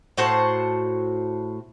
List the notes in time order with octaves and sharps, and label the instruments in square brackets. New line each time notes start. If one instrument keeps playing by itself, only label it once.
[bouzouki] A2 F#4 C5 A5